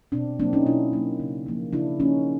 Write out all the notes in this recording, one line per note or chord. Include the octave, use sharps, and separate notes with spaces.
B2 C4 D4
F#3 A#3 C4 D4
C#4 D#4
B2 D4 E4
F#3 A#3
C#3
F3 A#3
C#3 D4 E4
F3 A#3 C#4 D#4